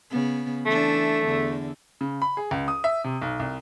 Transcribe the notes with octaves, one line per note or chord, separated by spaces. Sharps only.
C#3 B3
E3 A3 D4
E2 D3
C#3
B5
G#4
C#2
D#6
E5
C3
B1
C2